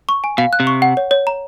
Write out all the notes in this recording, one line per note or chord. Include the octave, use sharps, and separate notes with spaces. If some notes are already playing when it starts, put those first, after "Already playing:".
C#6
G#5
B2 F5
F#6
C3
C#6
F#5
C#5
C#5
A#5